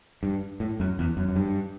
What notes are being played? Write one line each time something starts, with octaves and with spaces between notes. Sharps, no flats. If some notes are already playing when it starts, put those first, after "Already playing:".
G2
A2
F#2
E2
F#2
F#2
G2